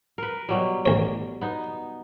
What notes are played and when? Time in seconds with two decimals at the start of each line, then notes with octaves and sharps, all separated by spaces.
0.18 A#4 B4
0.49 B2 F#3 G3
0.86 A1 C#5
1.41 B3 D#4